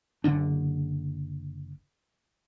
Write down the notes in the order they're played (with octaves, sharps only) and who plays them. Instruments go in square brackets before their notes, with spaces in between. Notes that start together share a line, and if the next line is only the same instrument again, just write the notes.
[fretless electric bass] F#1 D3 D4